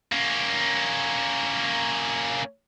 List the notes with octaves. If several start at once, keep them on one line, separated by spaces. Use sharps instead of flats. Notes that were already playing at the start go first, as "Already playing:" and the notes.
A#3 C#4